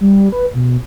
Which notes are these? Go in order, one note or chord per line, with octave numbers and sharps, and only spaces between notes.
G3
B4
B2